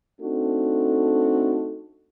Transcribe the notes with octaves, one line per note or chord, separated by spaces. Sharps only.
A3 C4 D4 D#4 F#4 A4